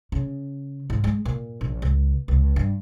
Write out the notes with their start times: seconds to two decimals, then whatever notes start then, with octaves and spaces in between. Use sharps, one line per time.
0.12 C#3
0.90 G#2
1.04 G#3
1.25 A#2
1.61 A#1
1.82 C#2
2.28 C#2
2.56 G2